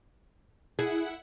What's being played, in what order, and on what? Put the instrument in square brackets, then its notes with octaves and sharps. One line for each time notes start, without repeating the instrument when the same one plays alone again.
[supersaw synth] E4 F#5 [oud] G#4